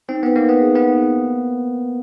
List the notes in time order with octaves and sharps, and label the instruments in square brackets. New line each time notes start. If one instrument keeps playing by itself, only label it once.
[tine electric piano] C4 [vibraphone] D#4
[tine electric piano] B3 [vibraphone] B4
[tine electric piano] A#3
[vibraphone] D#4
[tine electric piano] B3
[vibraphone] G#4
[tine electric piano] B3 [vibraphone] D#4